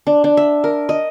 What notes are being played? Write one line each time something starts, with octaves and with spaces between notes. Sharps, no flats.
D4
D4
E5
A#4
D#5